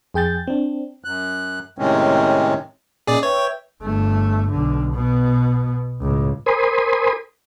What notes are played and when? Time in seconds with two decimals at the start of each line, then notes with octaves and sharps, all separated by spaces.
0.14 F2 G#4 G5 G6 A6
0.47 C4 D4
1.04 F#2 F#6
1.79 A2 C3 D#3 G#3 C4 C#4
3.07 A#2 C#4 D#4 G#4 D5
3.23 B4 C#5 E5 G5
3.83 G1 A3
4.50 B1 D3
4.94 B2 B3
6.01 C#2 A2
6.46 A#4 C5 G#5 B5 C6 D#6